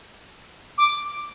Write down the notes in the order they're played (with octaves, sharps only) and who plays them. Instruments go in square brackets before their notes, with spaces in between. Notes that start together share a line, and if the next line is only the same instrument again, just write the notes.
[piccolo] D6